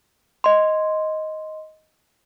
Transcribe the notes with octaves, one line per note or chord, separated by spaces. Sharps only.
D#5 C6